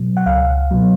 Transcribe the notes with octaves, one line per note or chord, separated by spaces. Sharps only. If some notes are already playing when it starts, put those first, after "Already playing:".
Already playing: B2 F#3
F#5
C#2 F5
B2 F#3